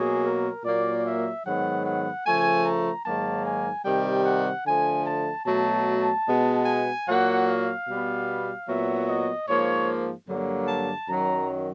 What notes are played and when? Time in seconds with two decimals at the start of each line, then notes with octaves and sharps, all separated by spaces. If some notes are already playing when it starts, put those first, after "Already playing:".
Already playing: B2 F#3 A#3 G#4
0.25 A#4
0.64 A#2 F#3 A#3 D5
1.05 E5
1.45 G#2 D#3 F#3 B3 F#5
1.85 F#5
2.25 C#3 F3 A3 G#5
2.65 A#5
3.05 G#2 D#3 F#3 A#3 A5
3.46 G#5
3.85 C3 D#3 G3 G5
4.25 F#5
4.65 D3 F3 A3 G#5
5.06 A5
5.46 B2 F#3 A3 A5
6.26 B2 G#3 B3
6.66 G#5
7.07 A#2 F#3 A#3 F#5
7.47 F5
7.87 B2 G3 B3
8.67 A#2 F#3 B3 E5
9.07 D#5
9.47 G#2 F3 A#3 C#5
10.27 G2 D3 F#3 A#3
10.68 A5
11.08 F#2 D#3 F#3 A#5